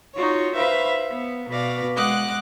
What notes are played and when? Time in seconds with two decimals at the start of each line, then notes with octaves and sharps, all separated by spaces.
0.14 D#4 F4 F#4 C#5
0.54 B4 C5 E5 F5 B5
1.10 B3
1.49 B2 B4 D5 F5 A#6
1.95 G#3 D#5 F#5 D6 F#6